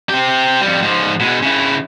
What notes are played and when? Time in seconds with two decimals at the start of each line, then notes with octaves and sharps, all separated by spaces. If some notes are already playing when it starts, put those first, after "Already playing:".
0.09 C4 G4
0.61 F2 G3
0.83 G#2 F3
1.20 B2 G#3
1.42 C#3 E4